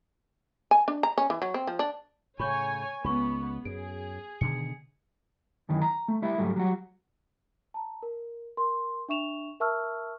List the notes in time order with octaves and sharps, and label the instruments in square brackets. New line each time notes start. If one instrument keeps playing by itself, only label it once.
[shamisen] G#5
D4
A#5
C#4
E3
F#3
C4
F3
D4
[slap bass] A2 C#3 [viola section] C#5 G#5 [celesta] B5 C#6 G6
[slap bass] C#2 [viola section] B3 [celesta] B5 C#6
[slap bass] F#2 [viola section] G#4 [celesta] D7
[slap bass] B2 D3 D#3 [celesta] C#7
[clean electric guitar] F#2 D#3 E3
A#5
A3
G3 E4 E5
G#2 F#3 G3 A3
F#3 G3 F#4
[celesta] A5 A#5
A#4
A#4 C6
D4 E5 C#6 E7 F7
A#4 E5 A5 C#6 E6 F6